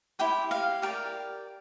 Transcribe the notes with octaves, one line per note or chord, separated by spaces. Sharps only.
E4 G4 C5 G5
F5
G4 A#4 D5 G5